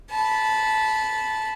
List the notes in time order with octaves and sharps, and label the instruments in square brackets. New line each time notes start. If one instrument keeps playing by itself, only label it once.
[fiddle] A5 B5